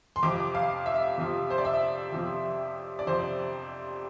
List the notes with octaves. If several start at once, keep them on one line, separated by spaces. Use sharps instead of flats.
C6
F2 C3 F3 D6
F5
E5
F2 C3 F3
C5
D5
E5
F2 C3 F3
D5
F2 C3 F3 C5